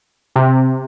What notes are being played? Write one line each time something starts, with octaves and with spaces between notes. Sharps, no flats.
C3